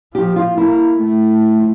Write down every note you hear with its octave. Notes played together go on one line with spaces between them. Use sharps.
F3 G4
F4
A#3 E4
A3
F3